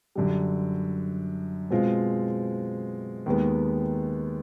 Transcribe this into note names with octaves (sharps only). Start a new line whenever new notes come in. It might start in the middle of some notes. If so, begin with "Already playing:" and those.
F#2 D3 G3
B2 G#3 C4 F4
D#2 D#3 G#3 B3